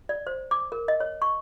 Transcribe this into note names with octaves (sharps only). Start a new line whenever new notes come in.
D5
C5
D6
A#4
D#5
C#5
C#6